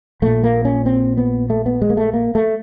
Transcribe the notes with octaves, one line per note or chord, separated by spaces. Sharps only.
A#1 A#2 A3
A#3
C#4
C4
B3
A3
B3
G#3
A#3
A3
A#3
A3